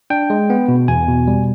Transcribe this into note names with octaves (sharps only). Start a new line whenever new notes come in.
D4 G5
G#3
B3
B2
E2 G#5
B2
G3